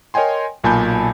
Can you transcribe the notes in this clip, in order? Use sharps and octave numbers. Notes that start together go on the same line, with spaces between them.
A#4 C#5 D#5 G5 G#5 C6
B1 A#2 G#5 A5 B5 G6